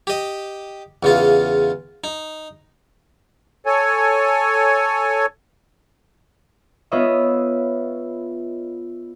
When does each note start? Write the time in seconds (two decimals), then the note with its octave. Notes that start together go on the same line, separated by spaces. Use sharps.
0.07 G4 D#5
1.03 E2 C#3 F4
2.04 D#4
3.66 A4 C#5 G#5
6.91 B3 F4 B4 C#5 D#5 E5